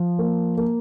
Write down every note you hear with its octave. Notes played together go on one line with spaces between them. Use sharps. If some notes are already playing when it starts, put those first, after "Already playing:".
Already playing: F3
A#3
A#3